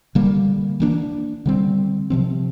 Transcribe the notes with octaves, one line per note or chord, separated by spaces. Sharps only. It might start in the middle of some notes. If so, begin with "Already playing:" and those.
D3 G3 A#3
E3 A#3 D4
D3 G3 C4
C3 F3 C4